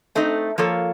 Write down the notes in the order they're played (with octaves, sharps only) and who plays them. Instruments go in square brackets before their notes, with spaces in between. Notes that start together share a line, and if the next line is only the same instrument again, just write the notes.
[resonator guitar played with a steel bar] A3 C4 D#4
F3 A#3 F4 A4 C#5